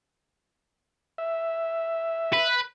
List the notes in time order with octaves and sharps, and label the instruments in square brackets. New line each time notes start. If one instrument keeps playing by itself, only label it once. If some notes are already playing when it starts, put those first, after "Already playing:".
[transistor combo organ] E5
[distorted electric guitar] B4